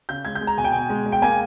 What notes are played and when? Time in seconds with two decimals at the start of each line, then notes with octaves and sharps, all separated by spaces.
0.09 C#3 G6
0.25 G#3 G#6
0.35 G6
0.41 G#3
0.47 A#5
0.57 B2 G#5
0.64 G5
0.72 B2 G#5
0.90 G#3
1.06 G#3
1.12 G5
1.22 A#3 G#5